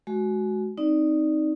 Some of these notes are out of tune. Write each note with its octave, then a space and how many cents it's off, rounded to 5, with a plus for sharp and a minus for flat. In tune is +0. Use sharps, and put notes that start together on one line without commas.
G#3 +30 F#4 +0
C4 +0 D#4 +0 D5 +5